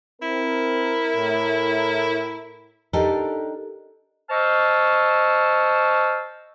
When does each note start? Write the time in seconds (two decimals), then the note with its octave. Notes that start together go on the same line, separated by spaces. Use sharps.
0.22 C4 E4 A#4
1.16 A2
2.93 D4 D#4 G4 A4 A#4
4.30 C5 D#5 A5 C#6 E6 F6